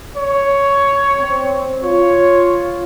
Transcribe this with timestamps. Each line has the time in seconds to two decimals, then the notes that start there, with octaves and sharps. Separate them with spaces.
0.17 C#5
1.18 C4
1.83 F4 C#5